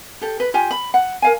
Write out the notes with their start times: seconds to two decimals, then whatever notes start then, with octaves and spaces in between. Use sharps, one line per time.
0.21 G4 A4
0.40 B4
0.54 F4 G4 G#5
0.71 B5
0.94 F#5
1.22 A#4 F5 G#5